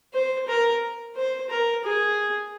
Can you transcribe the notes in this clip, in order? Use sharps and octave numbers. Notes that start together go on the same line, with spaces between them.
C5
A#4
C5
A#4
G#4